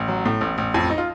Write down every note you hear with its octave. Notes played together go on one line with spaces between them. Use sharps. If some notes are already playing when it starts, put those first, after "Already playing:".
Already playing: A1
F#3
A2
A1
A1
F2
D#4
F4